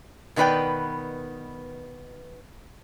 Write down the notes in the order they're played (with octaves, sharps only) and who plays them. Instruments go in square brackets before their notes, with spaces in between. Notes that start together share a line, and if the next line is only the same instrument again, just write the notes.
[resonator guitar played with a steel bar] B2 D#3 B3 B4 D5 G5